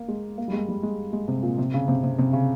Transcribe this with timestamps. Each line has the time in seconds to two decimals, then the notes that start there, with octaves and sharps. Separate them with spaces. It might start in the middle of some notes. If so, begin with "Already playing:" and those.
Already playing: A#3
0.08 G#3
0.38 A#3
0.48 G3
0.53 G#3
0.68 G3
0.83 G#3
1.13 G#3
1.28 C3
1.43 A#2
1.58 C3
1.74 C#3
1.88 C3
2.03 C3
2.19 C3
2.33 C#3